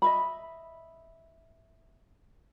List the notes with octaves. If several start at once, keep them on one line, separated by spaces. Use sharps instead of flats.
D#5 E5 B5